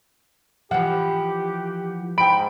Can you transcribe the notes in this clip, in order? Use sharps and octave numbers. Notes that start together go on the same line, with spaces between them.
E3 F3 G4 F#5
G#2 G5 B5 D7